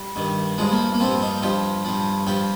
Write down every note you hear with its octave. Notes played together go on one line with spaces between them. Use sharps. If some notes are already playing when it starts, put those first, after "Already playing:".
Already playing: G3
G2 D#3
G2 F3 G#3
A#3
A#3
G2 F3 C4
D#4
G2 F3 G4
G2 F3
G2 F3 G4